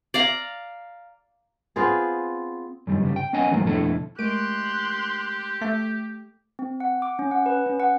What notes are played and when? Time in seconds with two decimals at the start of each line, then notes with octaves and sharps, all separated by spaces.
0.14 D5 F5 A#5
1.76 B3 C4 F4 G#4
2.87 F#2 D#3 G3
3.01 G2 C#3 G3
3.16 G5
3.33 B3 C#4 D#5 F#5 G#5
3.51 G#2 D#3 E3 F#3 A3 A#3
3.64 F2 B2 D3 A3 E4 A4
4.19 G#3 A3 G4 A#4 C6 F#6 D7
5.61 A3 D6
6.59 C4
6.80 F#5
7.02 D6
7.19 C#4
7.31 F#5
7.46 B4
7.66 C#4
7.80 F#5